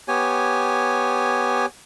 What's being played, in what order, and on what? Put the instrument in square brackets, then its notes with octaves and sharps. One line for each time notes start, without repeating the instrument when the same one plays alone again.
[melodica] B3 G4 C#5 G#5